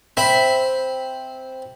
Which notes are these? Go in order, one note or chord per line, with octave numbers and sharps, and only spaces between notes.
C4 E5 B5